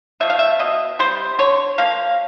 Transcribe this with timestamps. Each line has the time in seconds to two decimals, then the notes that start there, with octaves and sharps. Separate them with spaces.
0.20 F3 A3 E5
0.30 F5
0.39 E5
0.59 B2 D#5
0.99 G3 C4 C5
1.39 D3 C#5
1.78 F3 A#3 F5